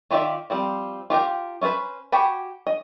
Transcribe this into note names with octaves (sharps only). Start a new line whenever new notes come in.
D#3 F4 G4 D5 E5
F3 G3 C4
F4 G4 A#4 G5
C#4 E4 F4 B4 C5
F#4 G4 G5 G#5 B5
D#5